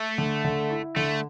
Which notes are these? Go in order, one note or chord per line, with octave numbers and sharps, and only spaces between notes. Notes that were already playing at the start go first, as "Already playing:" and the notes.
Already playing: A3
D3
D3
E4
D3 A3